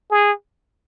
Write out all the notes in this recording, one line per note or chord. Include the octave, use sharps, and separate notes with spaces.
G#4